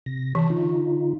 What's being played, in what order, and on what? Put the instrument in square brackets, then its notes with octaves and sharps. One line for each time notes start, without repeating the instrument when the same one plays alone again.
[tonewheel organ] C3 A#6
[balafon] E3 [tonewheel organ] A5
[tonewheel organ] D3 D#4 F4